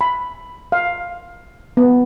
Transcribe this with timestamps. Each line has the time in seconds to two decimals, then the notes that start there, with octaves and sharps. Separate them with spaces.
0.01 B5
0.72 F5
1.77 B3